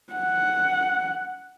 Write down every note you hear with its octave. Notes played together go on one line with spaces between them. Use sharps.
F#5